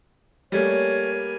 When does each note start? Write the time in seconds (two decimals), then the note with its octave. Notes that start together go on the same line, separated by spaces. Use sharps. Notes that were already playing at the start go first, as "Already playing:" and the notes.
0.52 G3 A3 A#3 C#5 G#5